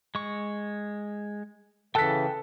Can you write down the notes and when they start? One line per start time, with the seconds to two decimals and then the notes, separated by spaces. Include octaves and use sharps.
0.15 G#3 C#6
1.95 C#3 E3 A4 G5 A5 F#6 B6